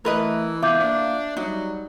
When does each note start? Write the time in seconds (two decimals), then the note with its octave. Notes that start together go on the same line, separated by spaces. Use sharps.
0.05 E3 A3 A#4 B4 D#5
0.63 B3 F4 E5 D6 G6
0.80 A#3 D4
1.37 F#3 G3 D#4